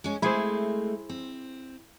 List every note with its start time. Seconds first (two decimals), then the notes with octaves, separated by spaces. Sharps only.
0.04 G#3 C#4
0.22 G#3 A3 C4 E4 G#4 C5
1.09 C4